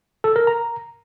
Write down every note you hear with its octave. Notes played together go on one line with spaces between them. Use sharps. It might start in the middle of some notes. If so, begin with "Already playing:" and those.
A4
A#4
A#5